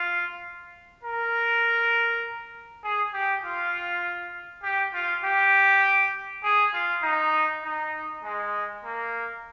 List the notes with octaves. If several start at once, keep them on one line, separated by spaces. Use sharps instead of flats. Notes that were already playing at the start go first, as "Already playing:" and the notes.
Already playing: F4
A#4
G#4
G4
F4
G4
F4
G4
G#4
F4
D#4
D#4
G#3
A#3